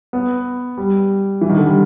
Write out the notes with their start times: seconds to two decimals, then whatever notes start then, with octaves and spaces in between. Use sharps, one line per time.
0.13 B3
0.77 G3
1.41 E3
1.50 D#3
1.58 D3
1.66 G3